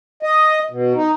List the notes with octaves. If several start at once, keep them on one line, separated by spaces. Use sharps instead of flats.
D#5
B2
D#4